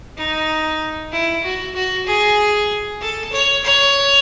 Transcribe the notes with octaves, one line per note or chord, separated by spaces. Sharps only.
D#4
E4
F#4
F#4
G#4
A4
C#5
C#5